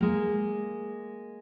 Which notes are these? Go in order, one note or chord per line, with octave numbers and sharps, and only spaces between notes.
G#3 A#3